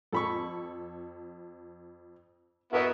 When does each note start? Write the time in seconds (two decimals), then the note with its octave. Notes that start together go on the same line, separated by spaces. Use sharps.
0.13 F2 A4 B5 C#6
2.73 B3 E4 F#4 A#4 B4 D#5